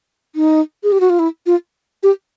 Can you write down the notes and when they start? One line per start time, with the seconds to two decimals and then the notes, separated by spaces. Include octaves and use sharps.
0.35 D#4
0.83 G#4
0.92 G4
1.00 F#4
1.10 F4
1.19 E4
1.46 F4
2.03 G4